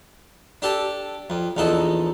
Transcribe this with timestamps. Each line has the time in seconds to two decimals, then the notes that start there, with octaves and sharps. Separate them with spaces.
0.62 D4 G4 A4
1.30 F2
1.57 A#1 E2 D#4 A4